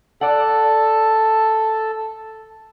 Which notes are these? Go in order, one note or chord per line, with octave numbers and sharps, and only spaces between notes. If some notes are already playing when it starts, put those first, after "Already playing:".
A4 D5 F#5